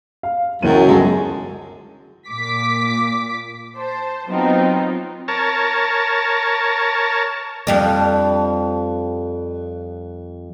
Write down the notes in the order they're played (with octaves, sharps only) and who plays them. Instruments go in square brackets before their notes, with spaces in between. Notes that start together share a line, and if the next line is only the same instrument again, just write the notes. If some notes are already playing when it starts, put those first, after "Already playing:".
[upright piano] F5
[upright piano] C#2 E3 D#7 [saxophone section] F#2
[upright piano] G1 [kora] G#3 A4
[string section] A#2 D6 B6
C5 A5
F#3 B3 C4 D#4 F4
[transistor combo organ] A#4 C#5 A5
[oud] F2 G3 D4